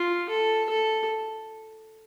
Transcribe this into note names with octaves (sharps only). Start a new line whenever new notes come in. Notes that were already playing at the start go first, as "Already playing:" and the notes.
Already playing: F4
A4
A4